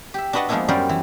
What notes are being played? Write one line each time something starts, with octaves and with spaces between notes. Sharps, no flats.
G4 E5
D4 F#4 B4 D#5 F#5 A5
F3 G#3 A#3 B3 D4 E4
F#2 G3 B3 A#4 C5 D5
E3